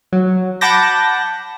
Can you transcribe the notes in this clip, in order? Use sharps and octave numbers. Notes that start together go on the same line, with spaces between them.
F#3
F#5 A5 B5 D6 G6 A#6